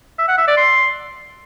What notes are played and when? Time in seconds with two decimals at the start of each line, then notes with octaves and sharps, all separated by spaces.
0.18 E5
0.28 F#5
0.38 E5
0.47 D5
0.57 C6